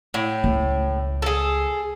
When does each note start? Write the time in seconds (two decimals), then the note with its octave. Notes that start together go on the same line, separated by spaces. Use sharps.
0.14 A2
0.44 C#2
1.22 G#4 A4